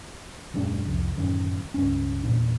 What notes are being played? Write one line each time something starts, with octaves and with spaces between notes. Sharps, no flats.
D#1 F#2 G#3 D4
C2 F2
D1 F#2 D#3 C#4
C#2 G2 C#4
E2 A#2 D4